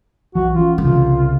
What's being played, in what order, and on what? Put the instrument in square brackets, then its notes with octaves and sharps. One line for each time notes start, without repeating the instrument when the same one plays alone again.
[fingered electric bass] B1 E3 F3 [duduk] F#4
[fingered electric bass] E3 C#4 [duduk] F4
[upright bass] C2 [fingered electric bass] C#3 [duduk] F4